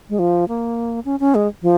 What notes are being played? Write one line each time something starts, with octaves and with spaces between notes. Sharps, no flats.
G#3
F3
A#3
C#4
C#4
G#3
F3